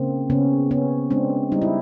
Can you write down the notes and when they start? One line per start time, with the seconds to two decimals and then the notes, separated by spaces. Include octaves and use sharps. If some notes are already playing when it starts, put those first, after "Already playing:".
Already playing: C#3 A#3 C4
0.30 C#3 B3 C#4
0.71 C#3 B3 C#4
1.10 G#3 C4 D4
1.52 G3 D#4
1.62 E4